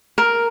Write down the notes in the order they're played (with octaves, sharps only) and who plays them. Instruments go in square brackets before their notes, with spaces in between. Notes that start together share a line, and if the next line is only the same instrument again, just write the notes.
[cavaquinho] A#4